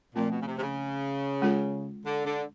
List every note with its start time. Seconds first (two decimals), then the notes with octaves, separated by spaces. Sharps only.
0.15 A#2 F3 A3 C4 F4
0.30 B2
0.41 C#3
0.46 C3
0.58 C3
0.62 C#3
1.42 G#3 C#4 F4 A4
2.06 D3
2.26 D3